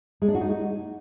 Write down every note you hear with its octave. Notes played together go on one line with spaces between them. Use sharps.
G#3
D4
F#4
D#4